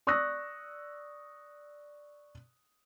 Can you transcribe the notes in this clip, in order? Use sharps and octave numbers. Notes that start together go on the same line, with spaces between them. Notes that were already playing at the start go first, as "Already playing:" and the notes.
D5 C#6 D#6 E6 F#6 A#6